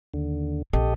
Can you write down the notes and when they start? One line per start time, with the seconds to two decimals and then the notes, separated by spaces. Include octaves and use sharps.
0.14 D#2 D3
0.73 A#1 C4 G4 A4 D#5